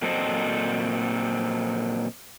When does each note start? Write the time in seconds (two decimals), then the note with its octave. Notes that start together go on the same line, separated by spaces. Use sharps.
0.02 A#2 F#3 C4 A4 C5 D#5